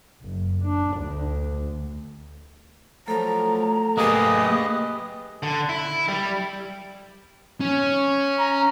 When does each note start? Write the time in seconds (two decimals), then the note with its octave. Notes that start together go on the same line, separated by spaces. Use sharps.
0.22 F#1
0.63 D4
0.98 D2
3.08 F3 F#3 A3 A4 A#5
3.97 A#3 G4 G#4 B4 D#5 D#6
5.43 D3
5.69 E4
6.08 G3
7.61 C#4
8.39 A#5